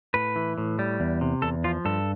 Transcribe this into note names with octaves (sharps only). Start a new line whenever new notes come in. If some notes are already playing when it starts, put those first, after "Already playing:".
A2 B4
E3
A2
G3
E2
C3
E2 A4
F3 F4
G2 A4